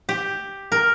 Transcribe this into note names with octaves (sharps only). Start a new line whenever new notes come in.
G4
A#4